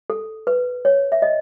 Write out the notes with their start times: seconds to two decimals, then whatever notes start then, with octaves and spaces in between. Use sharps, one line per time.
0.10 A4
0.47 B4
0.85 C#5
1.12 E5
1.22 D#5